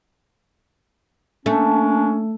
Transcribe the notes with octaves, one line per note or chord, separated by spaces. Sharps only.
A3 A#3 C#4 D4